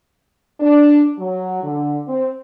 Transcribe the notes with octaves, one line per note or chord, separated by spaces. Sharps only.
D4
F#3
D3
C4